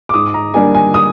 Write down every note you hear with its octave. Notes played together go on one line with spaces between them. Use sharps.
D6
G#2 D#6
A#5
G3 A#3 D4 G#5
G#5
D#6